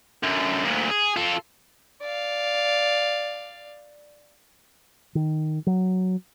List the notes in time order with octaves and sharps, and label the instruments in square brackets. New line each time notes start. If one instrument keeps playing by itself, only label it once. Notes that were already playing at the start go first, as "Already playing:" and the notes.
[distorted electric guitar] F#2 D3
D2 A#2
G#4
F4 A4
[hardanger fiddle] D5 F5
[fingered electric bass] D#3
F#3